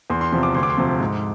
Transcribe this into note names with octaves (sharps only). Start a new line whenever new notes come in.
E2 C6
C6
C3 F3 C6
D6
D2 C6
D6
C6
C3 F3
G#2